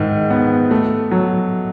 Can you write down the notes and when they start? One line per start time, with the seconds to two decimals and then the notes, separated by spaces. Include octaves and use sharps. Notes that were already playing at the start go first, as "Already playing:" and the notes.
Already playing: G#2 D#3
0.30 B3
0.71 A3
1.11 F#3